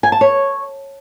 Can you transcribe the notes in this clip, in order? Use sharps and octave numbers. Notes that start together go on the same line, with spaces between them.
G#5
A5
C#5